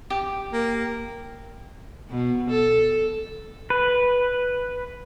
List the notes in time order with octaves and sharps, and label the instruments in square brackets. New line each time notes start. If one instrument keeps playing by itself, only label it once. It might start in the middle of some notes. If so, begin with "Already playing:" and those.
[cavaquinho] G4
[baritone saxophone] A#3
[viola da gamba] B2
A4
[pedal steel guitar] B4